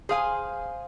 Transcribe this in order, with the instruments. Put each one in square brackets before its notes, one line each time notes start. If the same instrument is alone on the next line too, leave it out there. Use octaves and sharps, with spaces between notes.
[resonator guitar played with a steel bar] G#4 G#5 [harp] C5 F5